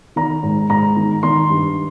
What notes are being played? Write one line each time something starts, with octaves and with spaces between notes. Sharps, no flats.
D#3 A#5
G#2
G#2 A#5
D#3
D#3 C6
G2